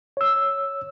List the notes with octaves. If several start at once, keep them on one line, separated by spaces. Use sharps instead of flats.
C#5 E6